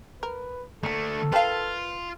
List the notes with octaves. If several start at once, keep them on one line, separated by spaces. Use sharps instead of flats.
A#4 B4
D3 A3 A#3 D4 A4
F4 A#4 B4 F5 G5 A5